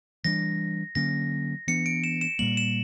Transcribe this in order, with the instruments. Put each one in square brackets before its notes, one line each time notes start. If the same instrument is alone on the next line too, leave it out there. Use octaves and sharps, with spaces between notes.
[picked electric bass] E3 G3 B3 D4 [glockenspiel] A#6
[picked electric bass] D3 F#3 A#3 C#4 [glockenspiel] A#6
[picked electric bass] E3 B3 D4 [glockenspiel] C#7
[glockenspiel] D7
E7
E7
[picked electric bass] A#2 G3 A#3 [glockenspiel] F#7
[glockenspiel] E7